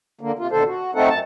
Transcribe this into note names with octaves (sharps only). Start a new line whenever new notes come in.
D3 A#3
C3 F4
D#2 B2 D3 A4 C5
F#4
A3 C4 D#4 A4 F#5
F#2 A5